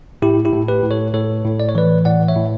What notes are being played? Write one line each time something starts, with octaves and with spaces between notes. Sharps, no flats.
A2 E4 G4
E4 G4
A2
G4 B4
A2
A4 C#5
A2 A4 C#5
A2
D5
C#5
E3 B4 D5
A2 D5 F#5
C#5 E5
A2